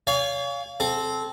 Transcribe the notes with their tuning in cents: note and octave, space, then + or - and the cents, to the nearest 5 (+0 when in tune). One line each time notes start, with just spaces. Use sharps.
C#5 +40 F5 +0 G#5 -30
C4 +0 A4 -20